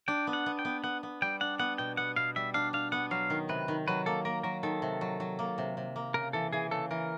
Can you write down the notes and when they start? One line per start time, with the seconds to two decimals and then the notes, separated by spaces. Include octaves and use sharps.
0.08 D4 G5
0.27 B3
0.33 F#5
0.46 B3
0.59 G5
0.65 B3
0.83 B3 F#5
1.03 B3
1.22 G3 G5
1.41 D4 F#5
1.59 B3 F#5
1.78 B2 G5
1.97 B3 F#5
2.16 B2 F5
2.36 G3 E5
2.54 D4 F5
2.73 D4 F5
2.92 B3 F#5
3.11 F#3 F5
3.30 D#3
3.49 C3 B4
3.68 D#3
3.88 F#3 B4
4.06 A#3 A4
4.25 A#3 A#4
4.43 F#3 A#4
4.63 D#3 A4
4.82 C3
5.01 F#3
5.20 F#3
5.39 A#3
5.58 C3
5.77 C3
5.96 A#3
6.14 C#3 A#4
6.33 E3 A4
6.53 E3 G#4
6.71 C#3 A4
6.91 E3 A#4